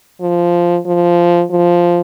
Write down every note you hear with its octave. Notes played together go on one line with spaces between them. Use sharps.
F3
F3
F3